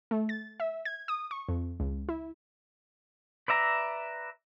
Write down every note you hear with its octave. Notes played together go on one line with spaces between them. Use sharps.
A3
A6
E5
G#6
D#6
C#6
F2
C#2
E4
B4 D5 E5 A#5